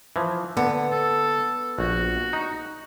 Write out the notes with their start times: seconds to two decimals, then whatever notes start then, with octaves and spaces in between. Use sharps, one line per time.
0.16 E3 F3
0.57 D3 B3
0.91 A4
1.79 A#1 F#4
2.33 D#4